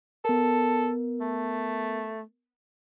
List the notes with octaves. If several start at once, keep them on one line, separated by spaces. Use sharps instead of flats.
B3 A4 A#4
A3